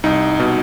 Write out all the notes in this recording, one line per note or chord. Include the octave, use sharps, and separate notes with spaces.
C2 D#4
B2